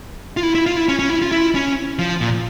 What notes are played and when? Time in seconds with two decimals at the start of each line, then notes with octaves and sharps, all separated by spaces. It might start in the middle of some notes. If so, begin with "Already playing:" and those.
0.37 F4
0.43 E4
0.55 E4
0.66 F4
0.76 E4
0.89 C#4
0.99 C#4
1.09 E4
1.22 F4
1.32 E4
1.55 C#4
1.99 F3
2.21 A#2